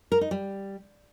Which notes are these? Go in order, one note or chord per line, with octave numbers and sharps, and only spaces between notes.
A#4
D#4
G3